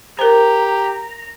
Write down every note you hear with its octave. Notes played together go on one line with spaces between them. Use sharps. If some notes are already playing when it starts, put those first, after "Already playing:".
G4 A#4 C5 A#5